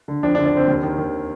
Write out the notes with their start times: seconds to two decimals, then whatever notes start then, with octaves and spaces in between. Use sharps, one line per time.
0.08 D3
0.23 F2 D4
0.35 D4
0.38 D3
0.46 D4
0.53 D3 C4
0.68 D#2
0.83 D#3
0.98 D#3